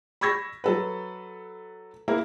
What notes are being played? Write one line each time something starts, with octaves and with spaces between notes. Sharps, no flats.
B5 C#6 E6 G#6 A#6 B6
F#3 A4 B4
A#3 E4 A#4